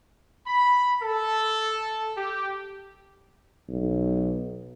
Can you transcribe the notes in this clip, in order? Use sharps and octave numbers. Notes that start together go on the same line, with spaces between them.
B5
A4
G4
B1